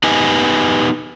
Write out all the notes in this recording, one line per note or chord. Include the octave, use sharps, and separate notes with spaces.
B3 D#4 G4 B4 D#5 G#5